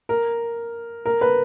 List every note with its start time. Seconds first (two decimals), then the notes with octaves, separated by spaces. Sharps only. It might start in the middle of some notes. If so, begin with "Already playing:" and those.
0.09 A#4
1.05 A#4
1.21 B4